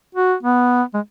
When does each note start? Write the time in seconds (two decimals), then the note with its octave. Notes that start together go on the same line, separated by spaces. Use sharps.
0.15 F#4
0.43 B3
0.94 G#3